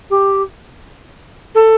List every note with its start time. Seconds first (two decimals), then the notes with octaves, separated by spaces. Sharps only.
0.10 G4
1.54 A4